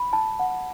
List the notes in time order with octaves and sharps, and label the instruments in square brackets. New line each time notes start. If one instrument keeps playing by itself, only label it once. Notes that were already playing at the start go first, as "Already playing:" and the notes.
Already playing: [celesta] B5
A5
F#5